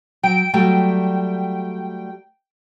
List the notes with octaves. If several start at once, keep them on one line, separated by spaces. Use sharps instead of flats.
F#3 G5 D7
F#3 G3 A3 G5